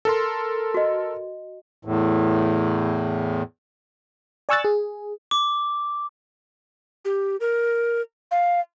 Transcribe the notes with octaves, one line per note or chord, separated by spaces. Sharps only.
A4 A#4 C6
F#4 D#5
E2 A2
D5 G#5 C#6 E6 F#6 A6
G#4
D6
G4
A#4
F5